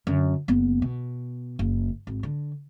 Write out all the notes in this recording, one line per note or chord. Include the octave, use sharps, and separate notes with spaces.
F#2 D3
F#1 B3
B2
F#1
G#1
D3